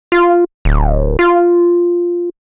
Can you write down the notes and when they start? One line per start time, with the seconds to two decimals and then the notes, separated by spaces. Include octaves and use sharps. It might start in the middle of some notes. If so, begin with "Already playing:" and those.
0.12 F4
0.65 D1
1.19 F4